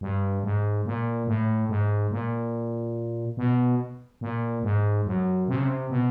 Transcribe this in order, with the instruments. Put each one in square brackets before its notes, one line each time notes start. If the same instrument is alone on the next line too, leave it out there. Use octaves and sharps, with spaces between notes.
[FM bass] G2
G#2
A#2
A2
G#2
A#2
B2
A#2
G#2
F#2
C3
C#3
C3
B2